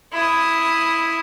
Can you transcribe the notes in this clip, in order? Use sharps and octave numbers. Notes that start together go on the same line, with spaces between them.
E4 D#6